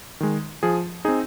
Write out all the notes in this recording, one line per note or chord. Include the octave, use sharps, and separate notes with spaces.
D#3 G#3
F3 G#4
C4 D#4 G#4